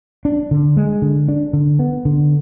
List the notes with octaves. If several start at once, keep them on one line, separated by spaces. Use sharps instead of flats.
D4
D3
G#3
D3
D4
D3
B3
D3